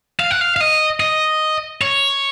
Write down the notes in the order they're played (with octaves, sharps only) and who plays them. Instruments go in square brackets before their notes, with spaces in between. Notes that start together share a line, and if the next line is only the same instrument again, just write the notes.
[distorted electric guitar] F5
F#5
F5
F5
D#5
D#5
C#5